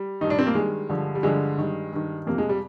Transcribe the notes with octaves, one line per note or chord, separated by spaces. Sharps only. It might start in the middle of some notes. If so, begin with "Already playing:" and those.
Already playing: G3
G2 D#3 D#4
D4
C4
A#3
G2 D#3 G#3
G2 D3 F3
G3
G2 D3 F3 G#3
G2 D#3
G2 D#3
F2 C3 F3 A#3
G#3
G3